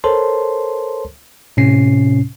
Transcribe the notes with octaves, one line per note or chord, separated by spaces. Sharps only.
A4 A#4 C5 C#5 A5 C6
A2 C3 C#4 C7